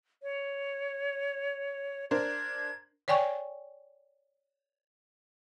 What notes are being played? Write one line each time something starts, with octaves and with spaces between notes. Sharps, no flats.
C#5
D4 A#4 C5 G#6
C#5 D5 G5 G#5 C#6